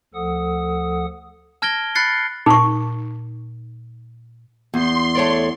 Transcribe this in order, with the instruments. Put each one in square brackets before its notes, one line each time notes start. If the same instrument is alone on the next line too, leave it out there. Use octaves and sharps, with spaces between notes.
[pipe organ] D2 F3 A4 F#5 D#6
[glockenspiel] A5 F6 G#6 A#6 D7 G7
B5 F6 F#6 A6 C7 C#7
[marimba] A#2 [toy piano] D#4 C#6
[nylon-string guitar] E2 [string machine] C6
[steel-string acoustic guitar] A3 C#5 D5